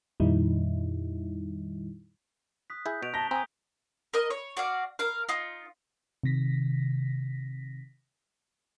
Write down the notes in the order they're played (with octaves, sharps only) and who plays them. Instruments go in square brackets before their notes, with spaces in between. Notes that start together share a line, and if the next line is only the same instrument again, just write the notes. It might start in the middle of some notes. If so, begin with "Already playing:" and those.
[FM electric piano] F2 A#2 D#3 G3 D#4 E4
[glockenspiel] D#6 F#6 B6
[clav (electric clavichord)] E4 G#4 [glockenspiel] G6
[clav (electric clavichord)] B2 [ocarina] D#5 [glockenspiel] C#6 D7 F7
[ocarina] A5 [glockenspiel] A#5 B6 G7 [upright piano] A#6
[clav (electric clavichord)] C4 [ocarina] G#5 [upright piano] A#5 [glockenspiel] D#6 G6
[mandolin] A#4 D#5
C#5
F#4 D5 F5
A#4 F5
D#4 F4
[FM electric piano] C3 D#3 A#6 B6